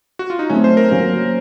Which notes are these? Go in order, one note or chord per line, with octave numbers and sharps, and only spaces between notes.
F#4
F4
D#4
F#3 A3 C4 C#4
C5
A#4
F#3 A#3 C#4